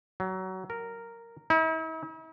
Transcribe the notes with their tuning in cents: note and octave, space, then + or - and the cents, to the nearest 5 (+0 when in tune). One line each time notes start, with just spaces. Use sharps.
F#3 +25
A#4 -10
E4 -45